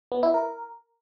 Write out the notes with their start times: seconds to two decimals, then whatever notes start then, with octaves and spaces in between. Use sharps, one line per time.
0.12 B3
0.23 E4
0.34 A#4